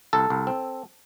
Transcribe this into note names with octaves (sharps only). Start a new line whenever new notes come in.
C2 A4
C2
C4